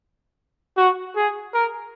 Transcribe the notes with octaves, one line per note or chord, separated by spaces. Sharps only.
F#4
G#4
A#4